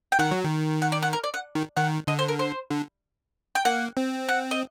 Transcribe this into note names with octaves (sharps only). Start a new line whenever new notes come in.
G5
D#3 F#5
F#3
D#3
F#5
D5
F#5
A#4
D5
F#5
D#3
D#3 F#5
D3 D#5
C5
A#4
C5
D3
G5
A#3 F#5
C4
F#5
D#5